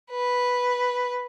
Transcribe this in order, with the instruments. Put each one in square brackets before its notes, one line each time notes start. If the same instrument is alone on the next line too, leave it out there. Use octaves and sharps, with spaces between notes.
[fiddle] B4